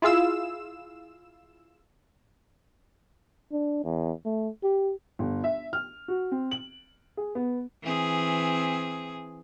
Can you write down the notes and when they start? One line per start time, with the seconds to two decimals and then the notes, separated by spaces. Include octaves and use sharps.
0.02 E4 F4 G#4 F5 E6 E7
3.52 D4
3.84 E2
4.25 A3
4.63 G4
5.19 G1
5.44 E5
5.73 F6
6.08 F#4
6.32 C4
6.51 F#7
7.17 G#4
7.35 B3
7.83 E3 C4 G#4